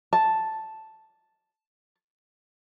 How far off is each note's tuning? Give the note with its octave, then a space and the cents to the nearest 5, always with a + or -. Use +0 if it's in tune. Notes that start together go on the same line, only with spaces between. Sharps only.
A5 +0